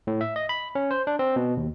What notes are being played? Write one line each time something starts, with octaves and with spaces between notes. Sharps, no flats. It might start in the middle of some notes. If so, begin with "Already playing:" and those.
A2
E5
D#5
B5
C#4
C5
D4
C4
B2
D#2